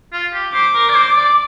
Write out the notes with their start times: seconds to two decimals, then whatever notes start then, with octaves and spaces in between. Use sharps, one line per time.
0.13 F4
0.33 G4
0.53 C5 D6
0.74 A#4
0.89 D5
0.95 C5
1.15 D5